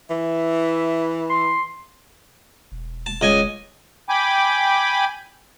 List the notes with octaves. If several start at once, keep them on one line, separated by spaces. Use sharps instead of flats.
E3 E5
C6
E1
A5
C#2 D#5 G#5
G5 G#5 B5 D6